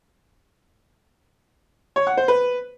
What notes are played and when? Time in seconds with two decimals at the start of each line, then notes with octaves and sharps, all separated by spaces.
1.96 C#5
2.07 F#5
2.17 C5
2.28 B4